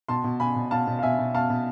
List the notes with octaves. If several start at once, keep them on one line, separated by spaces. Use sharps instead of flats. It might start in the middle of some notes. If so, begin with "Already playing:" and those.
B2 A5 C6
B2
B2 G#5 B5
B2
B2 F5 A5
B2
F5
B2 E5 G#5
B2
B2 F5 A5
B2